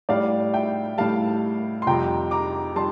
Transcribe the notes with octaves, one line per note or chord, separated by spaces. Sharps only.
A2 G3 D5 F5
E5 G5
A2 G3 F5 A5
C6
F2 C3 G3 G5 A#5
A#5 D6
G3 A5 C6